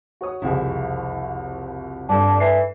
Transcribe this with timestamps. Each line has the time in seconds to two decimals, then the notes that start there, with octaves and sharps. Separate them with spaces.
0.21 F#4 C#5 D#6
0.42 F#1 C2 F2 E4 F#4 G#4
2.09 G2 D4 A4
2.40 E3 C7